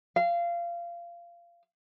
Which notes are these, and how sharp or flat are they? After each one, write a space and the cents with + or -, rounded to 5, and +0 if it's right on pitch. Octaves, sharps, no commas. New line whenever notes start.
F5 -20